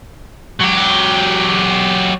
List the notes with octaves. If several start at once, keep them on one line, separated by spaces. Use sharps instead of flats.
F#3 G4